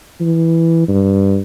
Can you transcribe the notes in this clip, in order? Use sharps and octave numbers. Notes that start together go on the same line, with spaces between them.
E3
G2